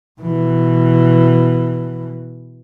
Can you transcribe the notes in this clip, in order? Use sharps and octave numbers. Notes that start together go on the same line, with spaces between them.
B2 E3